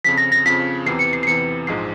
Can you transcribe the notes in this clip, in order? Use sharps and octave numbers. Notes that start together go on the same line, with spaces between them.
F2 C#3 F3 B6
A#6
A#6
F2 C#3 F3 B6
E2 C3 E3 C7
C#7
C7
C7
E2 C3 E3 C#7
A#1 G#2 F3 G#3 C7